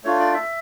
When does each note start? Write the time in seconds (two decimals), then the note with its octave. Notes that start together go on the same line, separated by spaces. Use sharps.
0.04 A3 D4 F4 C#5
0.20 D5
0.34 E5